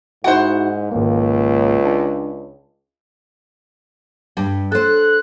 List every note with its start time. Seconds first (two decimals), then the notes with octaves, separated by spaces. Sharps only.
0.24 G#2 D#4 E4 F#4 C5 F#5
0.91 G#1 C#2 A#3
1.85 D4
4.37 G2 G3
4.72 A4 C5 F#6